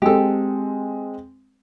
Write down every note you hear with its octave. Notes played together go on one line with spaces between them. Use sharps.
G#3 C4 G4 A4